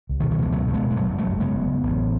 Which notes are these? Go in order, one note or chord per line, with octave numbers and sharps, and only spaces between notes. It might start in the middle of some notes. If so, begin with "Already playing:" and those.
C#2
D#3
B2
D#3 F#3
B2 E3 G#3
C#2 F#3 A3
C#2
G#3 B3
B2
G#3
F#1 F#3 A3
F#2
F#3 A3
F#1
C#3 G#3 B3
F#1
F#2
A1
A2